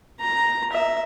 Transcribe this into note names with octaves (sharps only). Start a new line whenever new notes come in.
A#5
E5